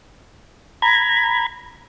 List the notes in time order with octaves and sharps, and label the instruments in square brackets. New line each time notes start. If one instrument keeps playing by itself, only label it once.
[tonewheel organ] A#5 B5 G#6